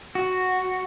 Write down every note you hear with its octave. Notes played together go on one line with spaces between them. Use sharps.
F#4